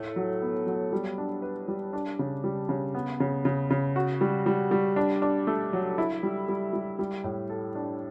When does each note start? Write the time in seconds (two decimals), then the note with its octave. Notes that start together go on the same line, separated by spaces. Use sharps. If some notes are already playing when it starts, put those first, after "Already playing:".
Already playing: A2 A3
0.16 F#3
0.42 B3
0.67 F#3
0.92 G3
1.18 D4
1.42 B4
1.68 G3
1.93 D4
2.19 C#3
2.44 G3
2.69 C#3
2.95 B3
3.20 C#3
3.45 C#3
3.70 C#3
3.96 F#4
4.21 G3
4.46 G3
4.71 G3
4.96 D4
5.22 D4
5.47 A3
5.73 F#3
5.98 E4
6.23 G3
6.49 G3
6.73 G3
6.99 G3
7.24 A2
7.50 A4
7.75 D4